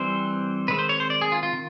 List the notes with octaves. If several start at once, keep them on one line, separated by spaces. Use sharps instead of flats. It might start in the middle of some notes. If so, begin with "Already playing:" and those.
Already playing: E3 G3 C4 C5
D#3 G#3 C4 B4
C5
C#5
C5
D5
G#4
F4
F4
D#3